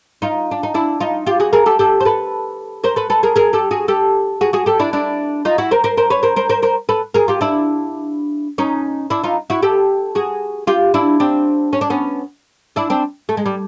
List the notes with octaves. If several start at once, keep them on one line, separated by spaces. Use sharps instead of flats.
D#4 F4
D4
D#4
D4 E4
D#4 F4
F4 G4
F#4 G#4
G#4 A#4
G4 A4
G4 A4
C5
A4 B4
A#4 C5
A4 B4
A4 B4
G#4 A#4
G#4 A#4
G4 A4
F#4 G#4
G4 A4
F#4 G#4
F#4 G#4
G4 A4
D4 E4
D4 E4
D#4 F4
E4 F#4
A#4 C5
A#4 C5
A#4 C5
B4 C#5
A#4 C5
A#4 C5
A#4 C5
A#4 C5
A4 B4
G#4 A#4
F4 G4
D4 E4
C#4 D#4
D4 E4
D#4 F4
E4 F#4
G4 A4
F#4 G#4
F4 G4
D4 E4
C4 D4
C#4
D4
B3 C#4
D4 E4
C4 D4
A3
G#3
G3